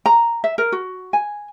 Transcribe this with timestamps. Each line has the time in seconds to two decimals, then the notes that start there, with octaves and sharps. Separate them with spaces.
0.06 A#5
0.44 E5
0.58 A#4
0.72 F#4
1.13 G#5